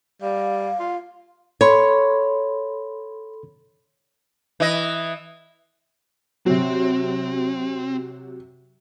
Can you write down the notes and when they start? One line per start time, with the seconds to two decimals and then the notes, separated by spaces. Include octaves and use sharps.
0.22 G3 F5
0.80 F4
1.61 A4 C#5 B5 C6
4.60 E3 D#5
6.46 C3 F#3 C4